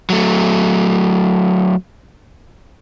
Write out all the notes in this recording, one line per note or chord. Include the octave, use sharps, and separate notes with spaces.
F#3 A3